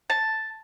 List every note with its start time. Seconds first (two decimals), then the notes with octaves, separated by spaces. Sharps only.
0.10 A5